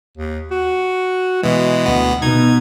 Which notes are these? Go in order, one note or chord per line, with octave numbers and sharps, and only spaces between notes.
D#2
F#4
B2 E3 G#3
D2 B2 B3
B2 D#4 G#6